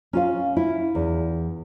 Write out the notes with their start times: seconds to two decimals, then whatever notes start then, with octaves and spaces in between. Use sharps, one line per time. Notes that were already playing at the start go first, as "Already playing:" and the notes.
0.13 C#4 F4 F5
0.57 E4
0.95 E2